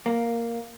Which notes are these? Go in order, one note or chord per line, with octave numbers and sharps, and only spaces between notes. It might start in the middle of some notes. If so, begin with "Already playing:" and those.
A#3